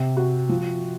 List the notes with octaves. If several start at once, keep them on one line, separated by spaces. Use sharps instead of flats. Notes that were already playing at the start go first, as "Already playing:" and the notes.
Already playing: C3
F#4
F3